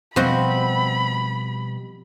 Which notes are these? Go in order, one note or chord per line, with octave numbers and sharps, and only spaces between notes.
B2 F3 G3 C4 F#4 D#5 B5